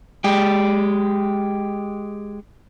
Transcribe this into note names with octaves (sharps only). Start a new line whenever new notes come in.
G#3 G4